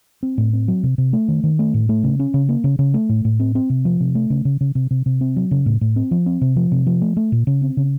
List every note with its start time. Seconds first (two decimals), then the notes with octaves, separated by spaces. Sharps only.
0.23 C4
0.38 A2
0.53 C4
0.68 F#3
0.83 C3
0.98 C3
1.13 A3
1.28 D#3
1.44 D#3
1.59 A3
1.74 A2
1.89 A3
2.04 C#3
2.19 C#4
2.34 C#3
2.49 A#3
2.64 C#3
2.79 C#3
2.94 A3
3.09 A2
3.25 A2
3.40 C4
3.55 C4
3.70 C3
3.85 F3
4.00 C3
4.15 A3
4.30 C#3
4.45 C#3
4.61 C#3
4.75 C3
4.91 C3
5.06 C3
5.21 C4
5.36 F#3
5.51 C#3
5.66 A2
5.81 A2
5.96 C4
6.11 F3
6.26 C4
6.41 C3
6.56 F3
6.72 C3
6.86 F3
7.02 A3
7.17 A3
7.32 A#2
7.47 C#3
7.62 C4
7.77 C#3